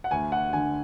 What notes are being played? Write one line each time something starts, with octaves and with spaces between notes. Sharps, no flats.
F#5
D2 G#5
F#5
D3 G#5